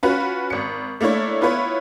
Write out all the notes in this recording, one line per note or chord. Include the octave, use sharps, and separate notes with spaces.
C#4 F4 F#4 B4
G#1 C#7
A3 A#3 D4 E4 C#5
B3 E4 F4 B4 C#5